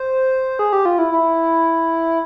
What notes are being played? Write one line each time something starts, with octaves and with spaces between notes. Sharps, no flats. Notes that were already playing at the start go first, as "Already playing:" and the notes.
Already playing: C5
G#4
G4
F4
E4
E4